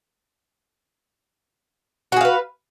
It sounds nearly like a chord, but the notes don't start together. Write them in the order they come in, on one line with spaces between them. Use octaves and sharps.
F#4 G#4 F5 B4